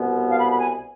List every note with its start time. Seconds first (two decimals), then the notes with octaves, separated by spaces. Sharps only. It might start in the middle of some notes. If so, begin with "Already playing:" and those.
Already playing: C2 B2 B3
0.30 F5
0.39 B5
0.51 B5
0.59 G#5